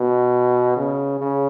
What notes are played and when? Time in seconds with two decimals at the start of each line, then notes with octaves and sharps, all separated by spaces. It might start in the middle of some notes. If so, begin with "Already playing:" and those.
Already playing: B2
0.77 C#3
1.19 C#3